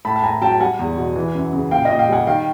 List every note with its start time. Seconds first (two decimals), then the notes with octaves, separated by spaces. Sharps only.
0.05 A2 A5 B5
0.16 A5
0.23 A2 G#5 A#5
0.42 F#3 G5 A5
0.52 A5
0.60 G3 F#5 G#5
0.79 E2
0.97 B2
1.16 E3
1.35 F#2
1.53 C#3
1.71 A#2 F5 G5
1.85 D#5 F5
1.90 A#2
1.99 F5 G5
2.08 G3 F#5 G#5
2.27 D#3 F5 G5